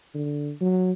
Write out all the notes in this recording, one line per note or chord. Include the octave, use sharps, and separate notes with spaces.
D3
F#3